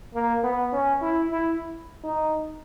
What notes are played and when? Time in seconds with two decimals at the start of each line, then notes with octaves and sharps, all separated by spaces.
0.14 A#3
0.44 B3
0.73 C#4
1.02 E4
1.31 E4
2.04 D#4